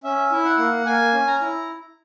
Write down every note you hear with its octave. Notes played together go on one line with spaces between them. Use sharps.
C#4 E5
E4
F#5
A#3
A#3 G#5
C#4
A#5
E4